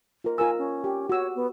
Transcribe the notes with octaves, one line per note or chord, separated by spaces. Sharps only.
F4 A#4
F4 A#4 G#5 E6
C#4
G4
F#4 C#5 E6
B3